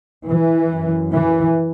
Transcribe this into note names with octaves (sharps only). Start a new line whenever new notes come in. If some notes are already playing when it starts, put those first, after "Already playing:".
E3
F#2
E3